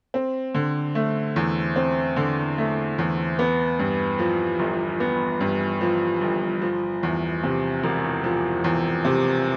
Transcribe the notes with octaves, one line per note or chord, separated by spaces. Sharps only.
C4
D3
A3
E2
C4
D3
A3
E2
B3
G2
F3
G1
B3
G2
F3
G1
F3
E2
C3
E1
F3
E2
C3